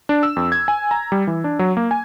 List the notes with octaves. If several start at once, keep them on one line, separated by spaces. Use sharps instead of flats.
D4
E6
F2
G#6
G#5
A#5
G3
E3
D4
F#3
A#3
G#5